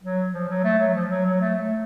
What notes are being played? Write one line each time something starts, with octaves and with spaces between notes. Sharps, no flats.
F#3
F3
F#3
A3
F#3
F3
F#3
F#3
A3
A3